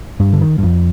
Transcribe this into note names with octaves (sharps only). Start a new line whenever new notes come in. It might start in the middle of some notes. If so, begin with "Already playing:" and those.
G2
D3
D#3
G2
F2